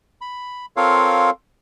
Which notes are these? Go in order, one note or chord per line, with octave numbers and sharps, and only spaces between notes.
B5
C4 F4 A4 A#4 C#5 F5